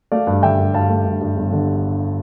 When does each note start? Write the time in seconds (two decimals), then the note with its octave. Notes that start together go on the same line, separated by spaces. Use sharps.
0.12 A3 D5 F5
0.27 G2
0.43 D3 E5 G5
0.59 G2
0.74 G2 F5 A5
0.90 A3
1.05 G2
1.21 G2
1.37 G1
1.52 D3